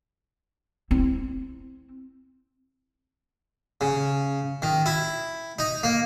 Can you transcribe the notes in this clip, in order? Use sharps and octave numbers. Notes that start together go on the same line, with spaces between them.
C4 E4
C#3
D#3
E4
D#4
A#3